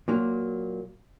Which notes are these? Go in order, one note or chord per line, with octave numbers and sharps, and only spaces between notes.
A#2 F#3 A#3